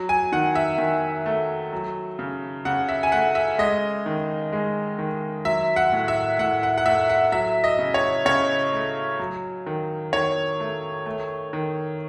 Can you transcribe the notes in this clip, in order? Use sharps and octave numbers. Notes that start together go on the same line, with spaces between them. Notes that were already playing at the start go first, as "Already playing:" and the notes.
Already playing: F#3
G#5
D#3 F#5
E5
D#3
A3
F#3
C#3
C#3 F#5
E5
G#5
A3 F#5
E5
G#3 D#5
D#3
G#3
D#3
F#3 E5
F#5
A2
E5
A2 F#5
F#5
F#5
A3 E5
F#5
F#3 E5
D#5
C#3
C#5
C#3 C#5
A3
F#3
D#3
D#3 C#5
A3
A3
D#3